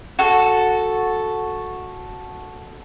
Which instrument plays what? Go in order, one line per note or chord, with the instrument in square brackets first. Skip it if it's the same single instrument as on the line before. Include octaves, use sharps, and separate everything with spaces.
[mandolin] F#4 A4